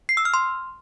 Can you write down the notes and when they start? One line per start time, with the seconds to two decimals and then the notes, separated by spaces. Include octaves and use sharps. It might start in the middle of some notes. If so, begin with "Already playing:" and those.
0.09 C7
0.17 E6
0.25 F6
0.34 C6